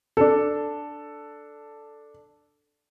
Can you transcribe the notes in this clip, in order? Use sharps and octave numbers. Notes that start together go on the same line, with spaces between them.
D4 A4